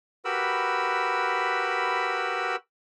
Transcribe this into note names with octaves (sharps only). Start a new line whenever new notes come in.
F#4 G4 A#4 B4 B5 E6